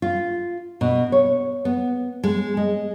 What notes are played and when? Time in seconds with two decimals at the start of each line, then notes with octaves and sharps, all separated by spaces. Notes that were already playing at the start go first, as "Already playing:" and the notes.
0.02 F4
0.81 B2
1.12 C#5
1.65 B3
2.24 G#3
2.57 G#3